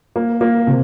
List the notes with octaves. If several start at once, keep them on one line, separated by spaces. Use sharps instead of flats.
A#3
A#3
C3